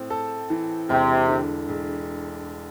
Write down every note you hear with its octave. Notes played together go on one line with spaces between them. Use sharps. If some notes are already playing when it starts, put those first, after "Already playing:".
Already playing: A2 C4
A4
E3
E1 C3
D3
E1